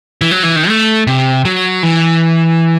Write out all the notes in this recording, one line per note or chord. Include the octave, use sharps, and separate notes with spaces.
E3
F#3
E3
D#3
A3
C3
F#3
E3